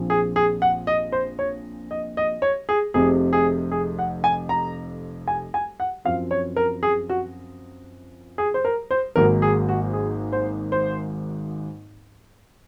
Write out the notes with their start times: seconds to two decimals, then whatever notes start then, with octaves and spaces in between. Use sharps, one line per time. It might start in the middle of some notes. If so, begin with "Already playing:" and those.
Already playing: A#1 A#2 F3 C4
0.10 G#4
0.36 G#4
0.62 F#5
0.87 D#5
1.12 C5
1.39 C#5
1.91 D#5
2.17 D#5
2.42 C#5
2.69 G#4
2.94 F1 F2 C3 G#4
3.33 G#4
3.72 G#4
3.99 F#5
4.24 G#5
4.49 A#5
5.28 G#5
5.54 G#5
5.80 F#5
6.05 F#2 F3 C4 F5
6.31 C#5
6.56 A#4
6.83 G#4
7.09 F#4
8.38 G#4
8.54 C5
8.65 A#4
8.91 C5
9.16 G#1 G#2 F#3 A#3 A#4
9.42 G#4
9.69 F#4
9.93 G#4
10.32 C5
10.72 C5